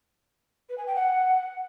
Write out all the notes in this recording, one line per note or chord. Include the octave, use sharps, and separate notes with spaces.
B4
G#5
G5
F#5